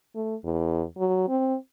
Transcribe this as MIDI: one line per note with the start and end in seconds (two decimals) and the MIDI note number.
0.15 0.35 57
0.44 0.84 40
0.98 1.28 54
1.28 1.56 60